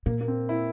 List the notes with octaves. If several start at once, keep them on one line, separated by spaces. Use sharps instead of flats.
A#2 A#3
A#3
C4
E4